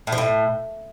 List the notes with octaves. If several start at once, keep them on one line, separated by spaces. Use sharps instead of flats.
A2
F3
A2